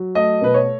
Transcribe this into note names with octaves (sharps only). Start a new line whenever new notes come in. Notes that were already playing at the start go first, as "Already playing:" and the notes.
Already playing: F#3
A3 D#5
B2 B4
C#5